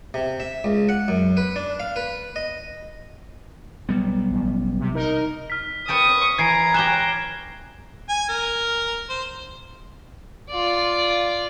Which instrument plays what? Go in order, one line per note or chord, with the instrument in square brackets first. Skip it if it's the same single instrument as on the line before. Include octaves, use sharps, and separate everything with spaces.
[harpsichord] C3
E5
C#2
F#5
F#2
B4
D4
F5
B4
D#5
[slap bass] B1 G3 B3
[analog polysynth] A1
C3
D#4 A#4 D#5
[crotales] F6 B6
[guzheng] B4 G5 A5 [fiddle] C#6 D#6
[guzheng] E3 [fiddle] A#5 [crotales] G#6 C7 D7
[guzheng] G4 C#5 G#5 [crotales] F#6 E7 G7
[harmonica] G#5
A#4
C5
[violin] F4 D5